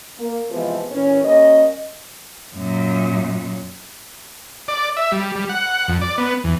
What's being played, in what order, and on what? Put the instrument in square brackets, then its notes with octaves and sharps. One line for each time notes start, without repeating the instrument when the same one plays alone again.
[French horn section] A#3
C3 E3 F3 G#3 B3
A#2 E3 C#4
G3 A#3 C#4 D#5
[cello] F#2 A#2
[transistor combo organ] D5
E5
G3
G3
F#5
F2
D5
B3
E2